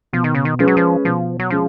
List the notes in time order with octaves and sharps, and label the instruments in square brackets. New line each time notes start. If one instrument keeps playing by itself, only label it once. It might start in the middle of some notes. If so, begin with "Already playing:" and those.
[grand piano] B2 [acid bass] F3
[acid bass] D#3
C#3
D#3
[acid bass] F3 [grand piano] G#3 C#4 G#4 B4
[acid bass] F#3
F3
[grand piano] B2 [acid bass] F3
[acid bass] F#3
[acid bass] F3 [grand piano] G#3 C#4 G#4